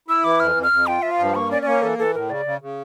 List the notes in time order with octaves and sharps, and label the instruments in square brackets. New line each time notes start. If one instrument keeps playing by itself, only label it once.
[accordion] E4 [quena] E6
[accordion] E3 [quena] D6
[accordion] F2 [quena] F6
[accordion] F2
[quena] F6
[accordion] F2
[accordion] F4 [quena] G5
[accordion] F3 [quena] E5
[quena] F5
[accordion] G2
[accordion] A#3 [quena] C#6
[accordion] C#4 [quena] D5
[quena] D5
[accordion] A#3 [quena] C#5
[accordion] E3 [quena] A4
[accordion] E3 [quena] A4
[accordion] A2 [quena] A#4
[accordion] C#3 [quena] D5
[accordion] C#3
C#3